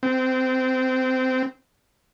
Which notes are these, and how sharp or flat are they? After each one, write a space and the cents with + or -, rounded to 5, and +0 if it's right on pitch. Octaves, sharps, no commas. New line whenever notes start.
C4 -20